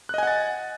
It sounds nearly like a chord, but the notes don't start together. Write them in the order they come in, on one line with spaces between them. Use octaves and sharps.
F#6 D#5 G#5 F#5 A6